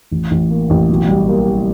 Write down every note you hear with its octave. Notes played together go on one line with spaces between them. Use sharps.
A1
A1
A#3
A1
B1
G3
A#3
A#3